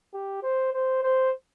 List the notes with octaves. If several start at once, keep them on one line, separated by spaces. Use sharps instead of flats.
G4
C5
C5
C5